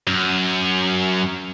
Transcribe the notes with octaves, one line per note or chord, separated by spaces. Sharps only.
F#2